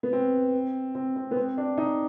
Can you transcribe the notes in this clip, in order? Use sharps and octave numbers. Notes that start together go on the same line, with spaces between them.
B3
C4
C4
C4
B3
C4
D4
D#4